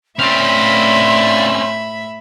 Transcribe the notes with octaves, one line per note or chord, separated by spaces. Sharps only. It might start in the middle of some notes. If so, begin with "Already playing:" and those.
A2 C4 C#4 D5 E5 F5 B5 C6